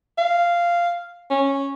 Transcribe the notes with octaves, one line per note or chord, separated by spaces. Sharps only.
F5
C#4